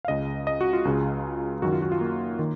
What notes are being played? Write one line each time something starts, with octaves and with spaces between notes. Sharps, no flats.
F5
C#2 C#3 D#5
D#5
F#4
F4
C#2 C#3
F#2 D#3 F#4
F4
F#4
F4
A#3
D#3